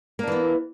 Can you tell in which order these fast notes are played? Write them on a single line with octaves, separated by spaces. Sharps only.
A#3 D4 E3 B3